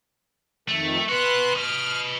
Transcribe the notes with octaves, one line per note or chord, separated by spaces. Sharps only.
F2 D#3 A3
B3 F#4 B4 C6 F#6
B4 D#5 F6